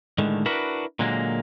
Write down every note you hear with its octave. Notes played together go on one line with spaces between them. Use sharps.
A2 D3 D#3 G#3
D4 E4 F#4 A#4 B4
A#2 D3 F#3 G#3 A#3